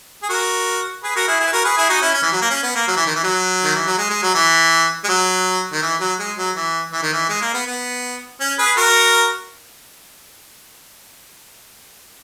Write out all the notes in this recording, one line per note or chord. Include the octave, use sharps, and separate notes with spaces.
G#4
F#4 A#4
G#4 B4
F#4 A#4
E4 G#4
E4 G#4
B4
F#4 A#4
G#4 B4
E4 G#4
D#4 F#4
C#4 E4
C#4
E3
F#3
A#3
C#4
B3
A#3
F#3
E3
D#3
E3
F#3
D#3
E3
F#3
G#3
G#3
F#3
E3
G#3
F#3
D#3
E3
F#3
G#3
F#3
E3
E3
D#3
E3
G#3
A#3
B3
B3
C#4
G#4 B4
F#4 A#4